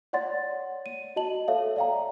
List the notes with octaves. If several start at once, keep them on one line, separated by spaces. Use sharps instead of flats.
C#5 D5 F#5 C6 A6
D#7
F#4 D#5 A5 F#7
A4 C#5 E5 F5
D5 E5 F5 G5 A#5